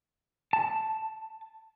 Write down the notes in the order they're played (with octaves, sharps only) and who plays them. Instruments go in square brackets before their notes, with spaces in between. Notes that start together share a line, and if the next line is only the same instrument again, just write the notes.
[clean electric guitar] A5